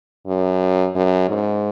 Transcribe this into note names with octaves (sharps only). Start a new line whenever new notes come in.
F#2
F#2
G#2